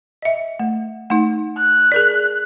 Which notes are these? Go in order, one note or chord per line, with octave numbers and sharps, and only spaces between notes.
D#5 E5
A3
A3 D#4
F#6
G#4 A#4 D5